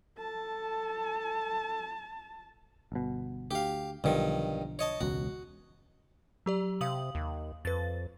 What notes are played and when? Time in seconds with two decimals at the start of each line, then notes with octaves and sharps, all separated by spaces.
0.18 A4 A5
2.92 G1 B2
3.51 D2 G4 F5
4.04 B1 G2 D3 D#3 F3
4.79 C#5 D#5 A5
5.01 E1 C#2 F#4
6.46 F#3 G4 D5
6.81 C3 F5 D#6 F#7
7.15 D#2
7.65 F2 B4 A6